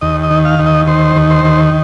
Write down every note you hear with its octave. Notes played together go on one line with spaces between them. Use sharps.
D#2 D#5
D#5
D#3
F5
D#2
D#5
D#3 C5
D#2
C5
D#3